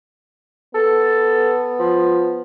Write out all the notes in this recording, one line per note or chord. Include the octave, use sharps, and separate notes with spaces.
B3 A4
F3